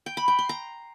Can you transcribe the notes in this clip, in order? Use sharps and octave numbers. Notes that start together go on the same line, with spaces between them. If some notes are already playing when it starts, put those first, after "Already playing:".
G5
B5
G5
C6
A#5